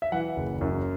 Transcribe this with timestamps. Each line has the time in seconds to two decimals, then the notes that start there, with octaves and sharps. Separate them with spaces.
0.02 E5
0.12 E3 F#5
0.36 F#1
0.61 F#2